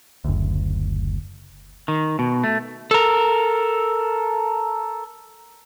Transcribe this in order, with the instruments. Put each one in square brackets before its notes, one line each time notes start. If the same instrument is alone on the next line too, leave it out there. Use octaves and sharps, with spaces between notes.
[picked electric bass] F#1 D2
[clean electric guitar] D#3
B2
A3
[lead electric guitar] A4 A#4